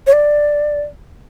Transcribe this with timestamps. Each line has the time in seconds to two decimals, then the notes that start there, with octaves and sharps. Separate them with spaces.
0.07 C#5
0.13 D5